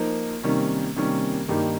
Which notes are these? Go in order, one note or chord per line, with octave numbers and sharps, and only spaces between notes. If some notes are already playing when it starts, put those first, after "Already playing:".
Already playing: F3 A#3 D#4 A#4
C3 D#3 G3 A#3 C#4
C3 D#3 G3 A#3 C#4
G2 D#3 A#3 D#4 G4